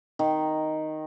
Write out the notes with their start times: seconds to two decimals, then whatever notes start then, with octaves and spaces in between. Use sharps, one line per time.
0.19 D#3